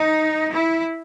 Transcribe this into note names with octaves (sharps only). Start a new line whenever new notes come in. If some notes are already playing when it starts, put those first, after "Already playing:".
Already playing: D#4
E4